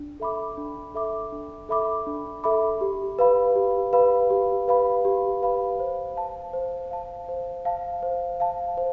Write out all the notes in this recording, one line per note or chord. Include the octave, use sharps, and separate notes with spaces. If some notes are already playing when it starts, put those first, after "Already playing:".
Already playing: D4
A4 E5 B5 D6
D4
A4 E5 B5 D6
D4
A4 E5 B5 D6
D4
A4 E5 B5 D6
G4
B4 F5 B5
G4
B4 F5 B5
G4
B4 F5 B5
G4
B4 F5 B5
C5
F5 A5
C5
F5 A5
C5
F5 A5
C5
F5 A5
C5